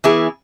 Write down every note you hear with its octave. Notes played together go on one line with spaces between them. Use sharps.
E3 B3 E4 G#4